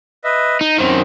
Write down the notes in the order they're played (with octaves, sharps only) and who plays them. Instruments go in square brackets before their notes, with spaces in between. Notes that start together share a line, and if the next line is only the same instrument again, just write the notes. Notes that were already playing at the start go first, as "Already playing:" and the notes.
[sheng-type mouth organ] B4 D#5 E5
[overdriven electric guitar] D#4
[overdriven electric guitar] F#2 D#3 [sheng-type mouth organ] C4